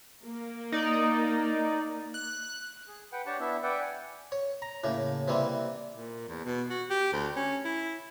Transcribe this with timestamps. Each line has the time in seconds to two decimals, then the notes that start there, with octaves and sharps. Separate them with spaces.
0.24 A#3
0.72 D#4 D5
2.14 F#6
2.87 G#4
3.12 B4 F#5 G5
3.26 D4 G4 C#5 F#5 A5 C#6
3.40 B3 D4 E4 E5
3.63 B4 D5 E5 F#5 G5
3.81 F#5 G#5
4.32 C#5
4.62 A#5
4.84 A2 C#3 A#3
5.28 C3 E3 G3 A#3 C4
5.94 A#2
6.28 E2
6.45 B2
6.70 F#4
6.90 G4
7.13 D2
7.36 C#4
7.64 E4